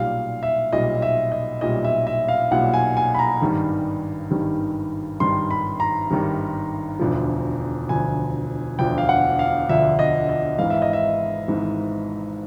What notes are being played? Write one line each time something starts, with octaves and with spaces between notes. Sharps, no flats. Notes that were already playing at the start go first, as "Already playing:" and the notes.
Already playing: B1 A#2 G3 F5
E5
B1 A#2 G3 D#5
E5
D#5
B1 A#2 G3 D#5
E5
E5
F5
B1 A#2 G3 F#5
G#5
G#5
B5
A#5
G#1 G2 D#3 G3
G#1 G2 D#3 G3
G#1 G2 D#3 G3 C6
B5
A#5
G#1 G2 D#3 G3
E1 D2 D3 F3
E1 D2 D3 F3 G#5
E1 D2 D3 F3 G5
F5
F#5
F5
E1 D2 D3 F3 E5
D#5
D#5
G#1 G#2 E3 F5
E5
D#5
E5
G#1 G#2 E3